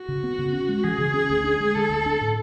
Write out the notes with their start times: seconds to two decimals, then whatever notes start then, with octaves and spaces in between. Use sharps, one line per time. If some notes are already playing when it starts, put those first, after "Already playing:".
Already playing: F#4
0.09 C#3
0.23 B3
0.39 C#3
0.53 C#4
0.69 G#3
0.83 E3 G#4
0.98 C#3
1.14 C#4
1.30 D2
1.44 D4
1.60 G#3
1.74 D3 A4
1.90 D2
2.06 D4
2.21 A2